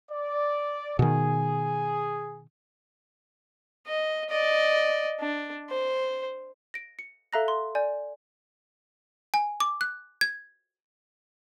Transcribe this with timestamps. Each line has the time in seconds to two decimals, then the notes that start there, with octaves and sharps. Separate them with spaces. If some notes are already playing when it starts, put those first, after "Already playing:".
0.11 D5
0.99 B2 D#3 G#4
3.87 D#5
4.30 D5 D#5
5.21 D4
5.70 C5
6.74 A#6 D7
6.99 C#7
7.33 A4 E5 F5 A#5 F#6 A#6
7.48 C6
7.75 D5 G#5 G6
9.34 G#5
9.60 D6
9.81 F#6
10.21 G#6